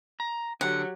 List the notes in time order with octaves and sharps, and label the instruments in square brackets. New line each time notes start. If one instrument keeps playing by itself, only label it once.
[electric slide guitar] A#5
[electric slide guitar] D3 [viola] F#3 G4 [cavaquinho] F#5